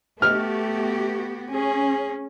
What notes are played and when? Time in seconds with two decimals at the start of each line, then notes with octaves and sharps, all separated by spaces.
0.22 A3 B3 F#4 G4 F6
1.51 C#4 G#4